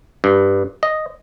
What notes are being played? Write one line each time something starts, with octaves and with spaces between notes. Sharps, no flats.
G2
D#5